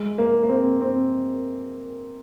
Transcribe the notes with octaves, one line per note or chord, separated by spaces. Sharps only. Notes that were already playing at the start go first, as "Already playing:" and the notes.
Already playing: G#3
A#3
A#3
C4
C4